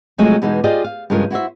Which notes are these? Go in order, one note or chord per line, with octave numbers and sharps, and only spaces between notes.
C3 F3 F#3 G#3 A3 G#5
E2 B2 E3 G#3 D#4 B4
F4 G4 G#4 C5 D5 D#5
F5
G2 C#3 F3 G#3 F4 A#4
E4 F#4 C5 E5